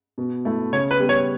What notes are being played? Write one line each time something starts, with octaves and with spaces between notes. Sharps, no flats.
B2
A3 E4
C#3 C#5
B4
G3 B3
C#5